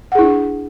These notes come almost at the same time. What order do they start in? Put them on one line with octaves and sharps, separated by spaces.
F#5 G#4 E4 D4